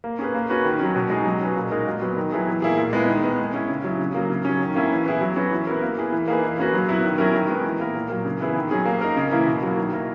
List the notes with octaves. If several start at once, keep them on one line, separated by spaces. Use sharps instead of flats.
A#3
C#4 G#4 B4
A#3
C#4 F#4 B4
D#3
F#3 C#4
B2
G#3 D#4 G#4
F#3
C#4 G#4 B4
A#2
G#3 D#4 F#4 A#4
A#2
F#3 B3
D#3
F#3 B3 E4 G#4
E3
A#3 E4 G#4
A#2
G#3 B3 E4
D#3
G#3 B3
G#3
C#4 E4
C#3
F#3 C#4 E4
C#3
F#3 A#3
C#3
F#3 C#4
D#3
A#3 C#4 E4
E3
B3 E4 G#4
F#3
C#4 F#4 B4
E3
B3 E4 A#4
A#3
E4 G#4 B4
E3
A#3 D#4 G#4 B4
E3
A#3 C#4 F#4 B4
F#3
B3 E4 B4
D#3
F#3 C#4 E4 A#4
D#3
G#3 B3
E3
A#3 E4 A#4
A#2
F#3 A#3
C#3
E3 B3 E4 G#4
D#3
F#3 C#4 G#4
A#3
D#4 A#4
C#3
E3 A#3 E4
B2
F#3 A#3
D#3
A#3 E4 A#4